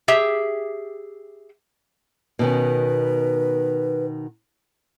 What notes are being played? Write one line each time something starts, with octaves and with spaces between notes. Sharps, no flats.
G4 G#4 E5
B2 D#3 C#4 B4